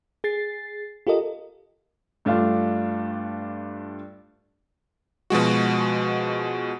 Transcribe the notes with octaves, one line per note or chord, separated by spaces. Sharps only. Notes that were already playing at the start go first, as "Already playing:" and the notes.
G#4 A6 C7
F4 G4 A4 A#4 D#5
G2 A3 D4 F4 F5
B2 F3 G#3 F#4